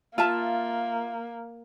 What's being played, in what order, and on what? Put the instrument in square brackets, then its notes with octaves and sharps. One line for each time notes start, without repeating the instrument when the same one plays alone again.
[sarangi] A#3 [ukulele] F4 E5 A5